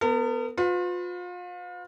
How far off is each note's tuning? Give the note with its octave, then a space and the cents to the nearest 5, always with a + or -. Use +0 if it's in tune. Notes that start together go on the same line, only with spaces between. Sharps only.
B3 +10 A#4 -45
F4 +35 B4 +35